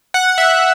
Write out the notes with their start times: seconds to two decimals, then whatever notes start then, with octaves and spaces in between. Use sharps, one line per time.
0.14 F#5
0.38 E5